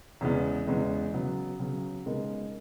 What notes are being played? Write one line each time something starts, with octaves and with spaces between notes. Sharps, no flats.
E2 C#3 G#3 B3
E2 C#3 G#3 B3
C#3 F#3 B3
C#3 F#3 B3
C#3 G#3 B3 D#4 A#4